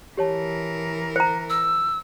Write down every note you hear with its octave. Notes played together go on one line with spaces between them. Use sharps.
E3 G4 A#4 C#5 A5
C5 A#5 C#7
E6